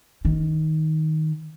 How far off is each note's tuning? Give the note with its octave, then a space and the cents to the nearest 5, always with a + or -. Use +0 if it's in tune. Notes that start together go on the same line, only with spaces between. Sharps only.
D#3 +10